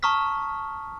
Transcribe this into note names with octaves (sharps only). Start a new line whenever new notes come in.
A5 A#5 C#6 D#6 F6 B6